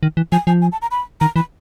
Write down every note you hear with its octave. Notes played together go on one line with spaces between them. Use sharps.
D#3
E3
F3 G#5
F3 G#5
G#5
A5
A#5
B5
D#3 A#5
E3 B5